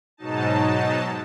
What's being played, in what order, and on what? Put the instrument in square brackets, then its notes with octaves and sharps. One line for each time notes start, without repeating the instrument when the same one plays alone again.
[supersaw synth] G#2 B2 F#3 D#4 A5